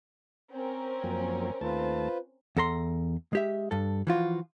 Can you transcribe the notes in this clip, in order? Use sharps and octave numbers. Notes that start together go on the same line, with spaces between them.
C4 C#4 A#4
F#2 F3 A#3
D#2 A3 F4 B4 C5 A5
E2 A4 A#5 C6
G#3 G4 E5
G2 A4
E3 F3 F4 F#4